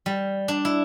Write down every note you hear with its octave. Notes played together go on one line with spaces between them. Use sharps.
G3
D4
E4